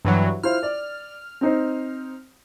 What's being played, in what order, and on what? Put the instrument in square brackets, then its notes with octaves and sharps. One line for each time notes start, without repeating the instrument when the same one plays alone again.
[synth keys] G2 E3 F#3
[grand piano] E4 F4 C5 [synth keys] F6
[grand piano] D5
C4 D#4 C5